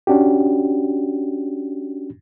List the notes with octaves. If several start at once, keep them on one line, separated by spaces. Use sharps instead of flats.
C#4 D4 F#4 G4